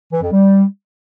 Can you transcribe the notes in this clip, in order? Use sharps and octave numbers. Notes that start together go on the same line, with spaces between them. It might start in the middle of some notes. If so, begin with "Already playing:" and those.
E3
F2
G3